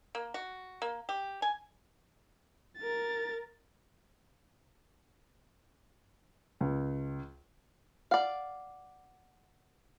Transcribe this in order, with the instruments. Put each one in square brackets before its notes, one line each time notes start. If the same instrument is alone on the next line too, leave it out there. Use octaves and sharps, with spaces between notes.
[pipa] A#3
F#4
A#3
G4
G#5
[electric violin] A#4 A6
[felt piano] C#2
[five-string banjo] D5 F5 [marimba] F#5